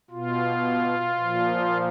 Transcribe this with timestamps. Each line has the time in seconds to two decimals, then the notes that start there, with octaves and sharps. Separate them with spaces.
0.11 B2 F4
1.17 A#2 F3